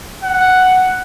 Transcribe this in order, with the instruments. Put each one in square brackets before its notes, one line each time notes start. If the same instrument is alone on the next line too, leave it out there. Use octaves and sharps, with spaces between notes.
[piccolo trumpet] F#5